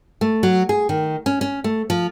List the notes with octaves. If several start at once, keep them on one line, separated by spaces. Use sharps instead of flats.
A3
F#3
G#4
D#3
C#4
C#4
A3
F3